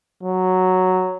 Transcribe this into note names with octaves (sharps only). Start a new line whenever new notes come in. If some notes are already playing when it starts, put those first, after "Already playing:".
F#3